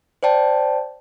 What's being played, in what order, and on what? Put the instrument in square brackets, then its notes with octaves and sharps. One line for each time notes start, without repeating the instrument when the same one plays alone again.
[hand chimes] C5 D5 G5 A5